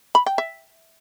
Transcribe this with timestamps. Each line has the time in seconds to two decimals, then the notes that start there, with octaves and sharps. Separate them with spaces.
0.15 B5
0.26 G5
0.38 E5